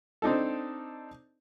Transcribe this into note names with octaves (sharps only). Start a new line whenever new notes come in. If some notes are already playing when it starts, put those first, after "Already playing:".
C4 D4 D#4 A4